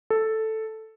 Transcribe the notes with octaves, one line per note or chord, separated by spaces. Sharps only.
A4